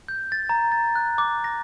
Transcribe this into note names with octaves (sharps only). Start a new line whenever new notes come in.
G6
A6
A#5
A6
F#6
D6
A#6